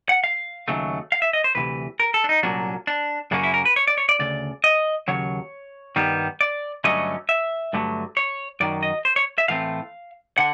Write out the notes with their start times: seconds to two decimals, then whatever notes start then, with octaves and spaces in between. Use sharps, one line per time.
0.09 F#5
0.24 F5
0.68 D#2 C#3 F#3 A3
1.12 F5
1.22 E5
1.33 D#5
1.44 C5
1.55 D2 C3 E3 B4
2.00 A#4
2.14 A4
2.24 D4
2.29 D#4
2.43 C2 A#2 F#3 A#3 C#4 D4
2.87 D4
3.31 F#2 C#3 F#3 A#3 C#4 D4
3.43 E4
3.54 A#4
3.65 B4
3.76 C#5
3.87 D5
3.98 C#5
4.09 D5
4.19 D2 C#3 D5
4.64 D#5
5.08 D#2 C#3 F#3 C#5
5.96 G2 D#3 G3 B3
6.41 D5
6.84 G2 D3 F#3 A3 C#4 D#5
7.29 E5
7.73 G2 D3 F#3 A3
8.17 C#5
8.60 F#2 D#3 F#3 D5
8.83 D#5
9.05 C5
9.16 C#5
9.38 E5
9.48 A2 E3 A3 C4 F5
10.38 D3 F#5